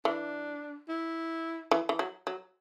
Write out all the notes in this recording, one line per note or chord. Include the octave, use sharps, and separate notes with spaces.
E3 D4
E4
E3
E3
F#3
F#3